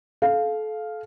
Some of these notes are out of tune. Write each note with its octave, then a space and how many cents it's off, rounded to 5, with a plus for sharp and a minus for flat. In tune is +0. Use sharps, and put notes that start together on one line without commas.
A4 -30 F5 +0